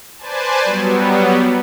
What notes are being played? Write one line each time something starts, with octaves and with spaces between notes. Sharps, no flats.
B4 C5 D5 G#5 A5
F#3 G3 B3